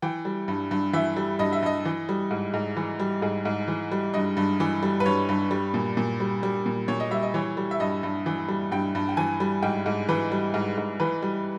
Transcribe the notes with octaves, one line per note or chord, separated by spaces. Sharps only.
E3 G5
G3
G2
G2
E3 E5
G3
G2 D#5
E5
G2 D#5
E3
G3
G#2
G#2
E3
G3
G#2 G#4
G#2
E3
G3
G2 D#5
G2
E3
G3
B4
G2 C#5
G2
G3
A#2
A#2
G3
G3
A#2
A#2 C#5
D#5
G3 E5
D#5
E3 C#5
G3
E5
G2 D#5
G2
E3
G3
G2 G5
G2
G5
E3 G#5
G3
G#2 G5
G#2
E3 B4
G3
G#2
G#2
E3 B4
G3